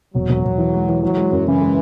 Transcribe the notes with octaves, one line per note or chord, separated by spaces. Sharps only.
E1 F#3
E1
E1
E3
G#3
E3
E3 F#3
G#3
F#2
C#3 E3
G#3